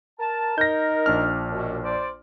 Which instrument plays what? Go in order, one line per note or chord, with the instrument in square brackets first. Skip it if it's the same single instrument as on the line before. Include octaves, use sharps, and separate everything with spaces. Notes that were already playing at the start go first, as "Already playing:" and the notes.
[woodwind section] A#4 A5
[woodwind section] D#4 A#4 [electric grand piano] G6 A#6
[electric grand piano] A#1 D4 F6
[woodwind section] F#2 B2
C5 D5